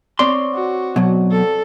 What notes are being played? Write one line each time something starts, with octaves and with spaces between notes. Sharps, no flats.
C4 C#5 D5 C6
F#4
B2 F#3
A4